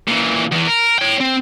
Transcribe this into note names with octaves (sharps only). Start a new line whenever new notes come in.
A#2 E3
E2 E3
A#4
C#5 G5
C4